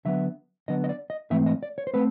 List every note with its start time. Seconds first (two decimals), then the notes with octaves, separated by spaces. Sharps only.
0.05 D3 F#3 B3 E5
0.68 D3 F#3 B3 D#5
0.84 D#5
0.89 D5
1.10 D#5
1.30 G#2 E3 A3 C4 E5
1.46 D#5
1.63 D5
1.78 C#5
1.87 C5
1.94 A3 C4 B4